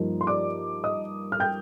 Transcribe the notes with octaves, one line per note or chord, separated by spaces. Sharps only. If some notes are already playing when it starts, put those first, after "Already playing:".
Already playing: G2 F3 A#3 D#4
C6
D5 D6
D#5 D#6
F6
G5 G6